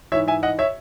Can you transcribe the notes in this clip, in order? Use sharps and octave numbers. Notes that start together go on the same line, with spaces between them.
G#2 E3 C#5 E5
E5 G#5
D#5 F#5
C#5 E5